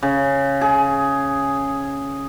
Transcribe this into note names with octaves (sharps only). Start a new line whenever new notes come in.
C#3
G#4